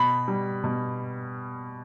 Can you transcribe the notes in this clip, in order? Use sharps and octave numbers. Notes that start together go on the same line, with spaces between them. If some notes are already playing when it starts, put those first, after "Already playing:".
Already playing: B2 B5
G3
B2